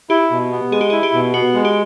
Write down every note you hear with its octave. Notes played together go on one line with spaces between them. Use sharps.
E4 G4
B2
B3
G#3 G#4
G4
E4 G#4
G4
B2
B3 F#4
G#3
G4